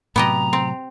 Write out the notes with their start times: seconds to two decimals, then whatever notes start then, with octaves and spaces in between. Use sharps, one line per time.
0.16 A2 C3 F#3 B3 G4 D#5 A#5
0.53 C4